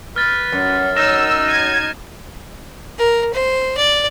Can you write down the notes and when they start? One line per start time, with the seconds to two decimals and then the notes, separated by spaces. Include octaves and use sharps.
0.16 B4 F6 A6
0.52 F#2
0.96 D#4 E6 F6 A#6 E7
1.48 G#6 A#6 D#7
2.98 A#4
3.33 C5
3.77 D5